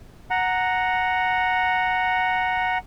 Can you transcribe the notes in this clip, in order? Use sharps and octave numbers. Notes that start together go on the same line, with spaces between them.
F#5 A#5